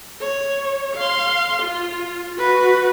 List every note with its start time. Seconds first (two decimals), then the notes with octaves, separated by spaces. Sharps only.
0.20 C#5
0.96 F5 C6
1.63 F4
2.37 F#4 B4